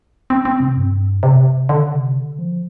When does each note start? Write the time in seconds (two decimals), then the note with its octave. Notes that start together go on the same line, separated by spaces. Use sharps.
0.30 C4
0.45 C4
0.60 C3
0.76 G2
1.23 C3
1.69 D3
1.92 C3
2.16 D3
2.39 F3